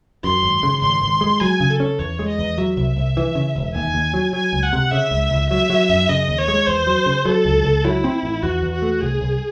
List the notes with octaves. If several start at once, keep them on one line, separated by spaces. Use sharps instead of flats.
F#2 C6
G#1
C#3
G#1 C6
G#1
G#3
F#3 G#5
C#3
A4
C#4
E2 C#5
G#3
D#5
E2
F#3 E5
C2
C2
E3
C#3
E1
D#2 G#5
D#2
F#3
F#3 G#5
C#2
F#5
C3
C#3 E5
C#2
C#2
F#3 E5
F#3
F#2
C#3 D#5
D#2
C#5
G#3
E2 C5
F#3
C#3
F#3 A4
C#2
C#2
F#3 E4
C4
A1
E2 F#4
E2
F#4
A3
C2 G#4
C2